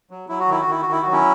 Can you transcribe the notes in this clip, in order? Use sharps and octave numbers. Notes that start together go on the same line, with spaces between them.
F#3
F#3 E4
F#4
D#3 E4
F#4
D#3 E4
F#4
D#3 E4
F#3 F#4
C#4 E4